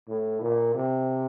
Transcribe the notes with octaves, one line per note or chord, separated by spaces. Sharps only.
A2
A#2
C3